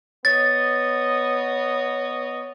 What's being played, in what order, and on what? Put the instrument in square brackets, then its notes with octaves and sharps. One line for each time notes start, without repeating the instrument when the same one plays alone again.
[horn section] B3 C#5 D#5 [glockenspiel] A6